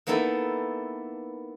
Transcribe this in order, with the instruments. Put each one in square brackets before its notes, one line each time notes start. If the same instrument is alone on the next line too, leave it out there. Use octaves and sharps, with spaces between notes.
[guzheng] A#3 B3 D#4 E4 A4